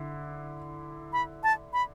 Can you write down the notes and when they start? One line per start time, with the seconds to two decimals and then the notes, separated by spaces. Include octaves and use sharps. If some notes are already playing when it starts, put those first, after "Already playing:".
Already playing: D3 E4
1.13 B5
1.43 A5
1.73 B5